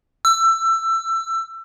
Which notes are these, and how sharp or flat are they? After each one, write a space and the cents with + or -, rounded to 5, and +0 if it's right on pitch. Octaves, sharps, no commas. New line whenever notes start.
E6 +20